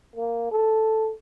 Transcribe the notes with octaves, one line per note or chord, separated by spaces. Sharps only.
A#3
A4